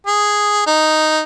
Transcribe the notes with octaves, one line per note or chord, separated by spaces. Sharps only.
G#4
D#4